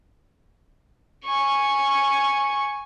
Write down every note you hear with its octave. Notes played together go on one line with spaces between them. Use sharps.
G#5 C#6